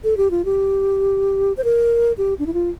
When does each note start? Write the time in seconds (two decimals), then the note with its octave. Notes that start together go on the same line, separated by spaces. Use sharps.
0.04 A4
0.17 G4
0.31 F4
0.45 G4
1.57 C5
1.64 A#4
2.18 G4
2.39 D4
2.46 E4
2.54 F4